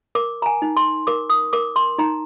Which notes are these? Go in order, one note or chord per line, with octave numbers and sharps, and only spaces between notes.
A#4 D6
A#5
G#5
D#4
C6
A#4 D6
D#6
A#4 D6
C6
D#4 A#5